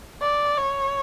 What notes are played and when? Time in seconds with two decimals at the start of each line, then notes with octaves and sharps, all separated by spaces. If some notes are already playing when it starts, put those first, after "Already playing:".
0.22 D5
0.57 C#5